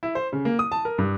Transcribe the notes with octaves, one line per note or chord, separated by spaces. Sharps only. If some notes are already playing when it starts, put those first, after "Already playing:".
E4
C5
C#3
A#3
D#6
A5
A#4
G2